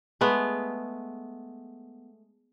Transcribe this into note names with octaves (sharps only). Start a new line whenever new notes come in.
G#3 A3 B3